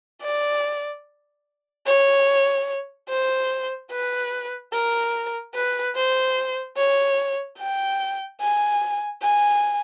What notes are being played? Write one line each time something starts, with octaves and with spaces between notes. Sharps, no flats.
D5
C#5
C5
B4
A#4
B4
C5
C#5
G5
G#5
G#5